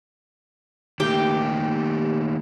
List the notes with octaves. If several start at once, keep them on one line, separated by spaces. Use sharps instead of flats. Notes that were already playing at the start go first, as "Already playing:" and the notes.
D#3 A3 A#3 G4